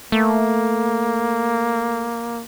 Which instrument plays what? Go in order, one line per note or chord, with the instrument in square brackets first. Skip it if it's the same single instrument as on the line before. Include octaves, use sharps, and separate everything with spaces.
[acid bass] A3 [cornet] A#3